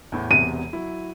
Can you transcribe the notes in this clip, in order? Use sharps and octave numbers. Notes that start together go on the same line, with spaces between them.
E2 A2
E1 E2 C3 D#7
F#3 E4